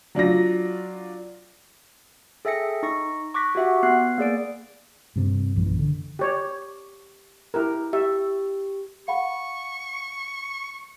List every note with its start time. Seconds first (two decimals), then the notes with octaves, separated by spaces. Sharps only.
0.15 F#3 D4 F4 A#6
2.45 G#4 A4 E5 G5 A#6 C#7
2.83 D#4 C#6 A#6 C#7
3.34 C#6 D6 F#6 A#6 B6
3.55 F#4 G4 E5 F#5
3.83 B3 F#6 C7
4.18 A#3 G#4 D5 D7
5.16 G2 C3
5.56 A#1 F#2 E3
5.79 D3
6.19 G4 C#5 D5
7.54 E4 G4 A#4
7.93 G4 E5
9.08 F5 F#5 B5 C#6